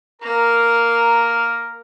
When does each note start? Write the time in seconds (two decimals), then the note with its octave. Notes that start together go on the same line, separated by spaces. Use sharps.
0.22 A#3 A#4 A#5